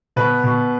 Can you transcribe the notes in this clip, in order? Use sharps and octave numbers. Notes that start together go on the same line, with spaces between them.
B2 B4
B2